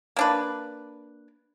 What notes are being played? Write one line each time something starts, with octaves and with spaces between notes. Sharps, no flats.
A#3 D4 B4